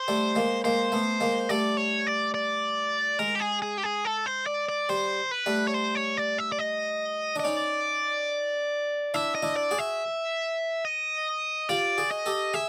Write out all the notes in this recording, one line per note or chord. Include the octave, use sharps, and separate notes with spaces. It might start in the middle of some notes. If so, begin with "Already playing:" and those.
Already playing: C5
G3 A3
G#3 A#3
G#3 A#3 C5
A3 B3
G#3 A#3
G3 A3 D5
C#5
D5
D5
G#3 A#4
G4
G#4
G#4
G4
G#4
A4
C5
D5
D5
G3 C5
B4
G3 A3
C#5
C5
C#5
D5
E5
D5
D#5
D4
D#5
C#4 D#4 D5
D4 E4 E5
D#5
D4 E4
D5
F#4 G#4
E5
D#5
F4 G4 D5
F#4 G#4
D#5
G4 A4
G#4 E5